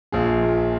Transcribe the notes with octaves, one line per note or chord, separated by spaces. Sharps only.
A#1 F4 G#4
A#2